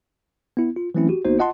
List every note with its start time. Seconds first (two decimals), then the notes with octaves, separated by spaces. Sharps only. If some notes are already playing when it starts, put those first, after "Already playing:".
0.57 B3 E4
0.76 F4
0.95 E3 F#3 A3 C4 C#4 E4
1.09 F#4 G4
1.25 G1 A#3 B3 D#4 F#4 C5
1.39 F4 D#5 F#5 A5 C6